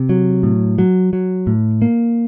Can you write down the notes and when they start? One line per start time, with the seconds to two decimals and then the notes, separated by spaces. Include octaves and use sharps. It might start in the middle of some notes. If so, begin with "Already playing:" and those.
Already playing: C3
0.09 F#3
0.43 A2
0.78 F#3
1.13 F#3
1.47 A2
1.82 A#3